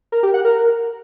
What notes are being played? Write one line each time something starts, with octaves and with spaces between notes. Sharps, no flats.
A#4
G4
F#5
A#4